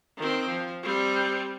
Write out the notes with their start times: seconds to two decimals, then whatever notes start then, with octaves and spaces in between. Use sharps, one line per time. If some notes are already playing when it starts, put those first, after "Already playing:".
0.18 D#3 C4
0.48 F3
0.83 G3 C4